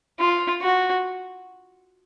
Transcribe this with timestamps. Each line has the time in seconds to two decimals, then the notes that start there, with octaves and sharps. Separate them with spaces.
0.19 F4
0.62 F#4